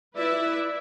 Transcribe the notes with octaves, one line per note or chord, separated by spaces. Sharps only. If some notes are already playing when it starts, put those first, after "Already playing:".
E4 B4 D5 E5